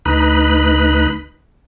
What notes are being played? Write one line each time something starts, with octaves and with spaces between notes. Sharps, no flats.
D2 D#4 B4 B5